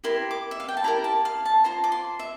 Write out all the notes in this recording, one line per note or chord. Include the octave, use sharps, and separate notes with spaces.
E4 G4 A#4 C6
D6
E5
F5
G5
A5
E4 G4 A#4 A#5
A5
F5
A5
F4 C5 A#5
D6
C6
E5